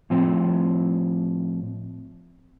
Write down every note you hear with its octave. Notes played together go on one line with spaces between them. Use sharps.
A2 F3 C4